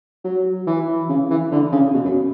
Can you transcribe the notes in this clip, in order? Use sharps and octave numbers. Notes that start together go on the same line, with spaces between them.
F#3
E3
C#3
E3
D3
C#3
B2
F#2